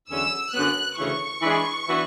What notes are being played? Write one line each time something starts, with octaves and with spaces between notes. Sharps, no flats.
E2 D3 F#3 C#4 E6
F#2 D3 F#3 B3 F#6
D2 C#3 E3 C#6
E3 G#3 D4 G#4
E3 B3 D4 F#4